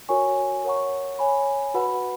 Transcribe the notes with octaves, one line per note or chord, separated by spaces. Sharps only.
F#4 A#4 C#5 G#5 C#6
A#4 C#5 F#5 A#5 C#6
C#5 G#5 B5
F#4 B4 F#5 B5